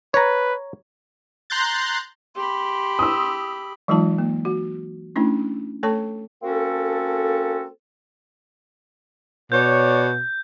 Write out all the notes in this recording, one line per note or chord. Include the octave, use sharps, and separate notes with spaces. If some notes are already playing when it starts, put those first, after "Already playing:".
B4 C#5 A#5
A#5 C6 F#6 G6 A6
G4 B5 C6
D#6 E6
E3 F#3 G#3 D#4 F4 A5
A#3
F#4
A3 C#4 D4 E4
A3 A4 C#5 A5 C#6
A#3 C4 C#4 F#4 A4
B2 C#5 D5 G6